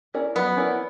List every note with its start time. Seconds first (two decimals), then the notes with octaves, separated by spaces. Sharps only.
0.14 C#4 E4 A#4 D5
0.35 F#3 B3
0.56 C#4 E4 A#4 D5